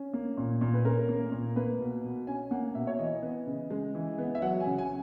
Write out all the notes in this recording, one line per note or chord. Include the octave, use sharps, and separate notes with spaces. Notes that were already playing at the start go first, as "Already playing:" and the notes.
Already playing: C#4
A#3
A#2
A#2
B4
C#4 A#4
A#3
A#2
A#3 B4
B2
B2
C#4 G#5
A#3 F#5
B2 E5
C#5
E3 D#5
B3
C#3
G#3
E3
B3
E5
F#3 F#5
G#5
C#3
G#5